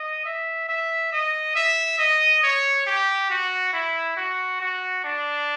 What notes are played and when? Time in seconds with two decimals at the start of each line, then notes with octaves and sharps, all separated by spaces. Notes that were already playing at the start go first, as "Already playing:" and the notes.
Already playing: D#5
0.25 E5
0.69 E5
1.12 D#5
1.56 E5
1.99 D#5
2.43 C#5
2.86 G4
3.30 F#4
3.73 E4
4.17 F#4
4.61 F#4
5.04 D4